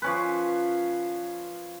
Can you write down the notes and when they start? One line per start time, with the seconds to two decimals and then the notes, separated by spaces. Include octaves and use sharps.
0.02 F3 C#4 B4